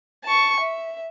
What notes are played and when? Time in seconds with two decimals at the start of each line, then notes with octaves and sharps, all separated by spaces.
0.24 A5 C#6
0.60 E5